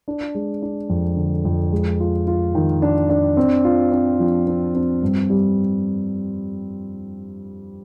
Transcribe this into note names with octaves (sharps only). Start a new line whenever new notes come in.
D4
G#3
D4
F2
D3
F2
G#3
F4
F4
D#3
D4
D4
C4
F4
C4
F3
C4
C4
G2
G3